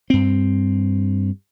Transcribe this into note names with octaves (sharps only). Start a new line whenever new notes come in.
G2 C4